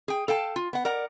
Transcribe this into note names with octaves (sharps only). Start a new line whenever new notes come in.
G#4 G5
A4 F5 G5 A5
F4
B3 F#5
A#4 D5 F#5